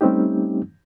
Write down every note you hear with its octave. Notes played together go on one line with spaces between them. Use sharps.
G3 A3 C4 C#4 D#4 G4